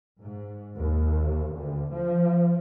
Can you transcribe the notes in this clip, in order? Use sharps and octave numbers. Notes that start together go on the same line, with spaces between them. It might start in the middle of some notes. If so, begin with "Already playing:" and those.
G#2
D#2
D2
F3